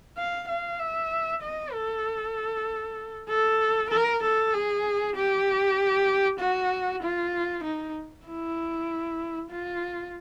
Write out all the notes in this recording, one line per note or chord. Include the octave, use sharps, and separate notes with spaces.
F5
F5
E5
D#5
A4
A4
A#4
A4
G#4
G4
F#4
F4
D#4
E4
F4